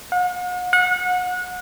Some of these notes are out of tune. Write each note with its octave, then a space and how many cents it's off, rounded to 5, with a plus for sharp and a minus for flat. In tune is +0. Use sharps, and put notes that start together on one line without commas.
F#5 -45
F#5 -30